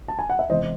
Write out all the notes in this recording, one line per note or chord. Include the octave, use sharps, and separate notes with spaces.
A5
G#5
F#5
E5
E2 C3 E3 G#3 C5 D#5